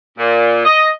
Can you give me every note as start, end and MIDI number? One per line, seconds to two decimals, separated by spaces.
0.19 0.65 46
0.65 0.89 75